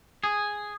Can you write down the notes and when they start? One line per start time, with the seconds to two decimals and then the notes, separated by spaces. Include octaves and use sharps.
0.24 G#4